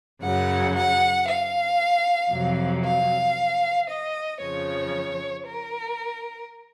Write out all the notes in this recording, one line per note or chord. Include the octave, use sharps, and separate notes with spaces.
F#2 C#3 F#3 F#5
F#5
F5
F2 C3 F#3
F5
D#5
F2 C#3 F3 C#5
A#4